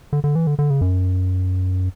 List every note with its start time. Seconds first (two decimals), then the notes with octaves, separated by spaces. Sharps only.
0.13 D3
0.24 D3
0.35 E3
0.47 D3
0.59 D3
0.70 C#3
0.81 F#2